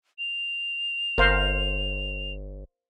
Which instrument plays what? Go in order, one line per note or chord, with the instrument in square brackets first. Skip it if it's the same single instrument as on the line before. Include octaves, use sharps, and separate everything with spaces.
[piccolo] F7
[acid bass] G1 [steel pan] A#4 C5 F5